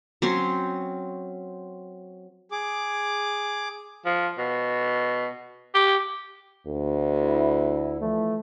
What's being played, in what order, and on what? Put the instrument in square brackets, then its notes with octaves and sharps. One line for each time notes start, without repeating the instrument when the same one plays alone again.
[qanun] F#3 C4 C#4 C6
[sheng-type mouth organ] G#4 D6
[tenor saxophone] F3
B2
G4
[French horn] D2
[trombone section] E4
E3 F3 A3